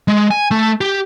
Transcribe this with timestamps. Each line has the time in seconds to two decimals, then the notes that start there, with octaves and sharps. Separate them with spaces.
0.08 G#3
0.31 G#5
0.51 A3
0.81 G4